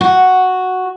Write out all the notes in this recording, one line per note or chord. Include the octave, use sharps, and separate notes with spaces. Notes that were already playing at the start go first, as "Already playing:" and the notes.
F#4